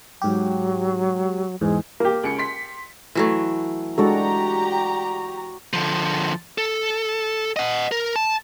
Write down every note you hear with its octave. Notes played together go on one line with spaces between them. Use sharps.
G#2 F#3 G4
E2 G#2 G#3
A#3 G4
C#2 C#4 C#7
C6 B6
E3 F#3 A3
G#3 D4 F#4 G4 A4 C#5 D5 A#5
D3 F3
A4
D#5 F#5
A#4
A5